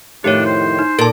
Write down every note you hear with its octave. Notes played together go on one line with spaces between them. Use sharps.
F2 A2 D#3 D4 G4 C#5
C5
D#4
A#2 A4 A5